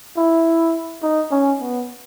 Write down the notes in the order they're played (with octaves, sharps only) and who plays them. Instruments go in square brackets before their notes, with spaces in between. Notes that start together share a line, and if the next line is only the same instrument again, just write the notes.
[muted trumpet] E4
D#4
C#4
B3